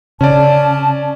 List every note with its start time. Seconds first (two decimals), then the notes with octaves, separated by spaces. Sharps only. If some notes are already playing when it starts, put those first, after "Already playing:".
0.21 C#3 C#4 D5 A5